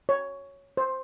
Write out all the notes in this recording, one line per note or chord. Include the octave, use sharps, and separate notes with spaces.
C#5
C5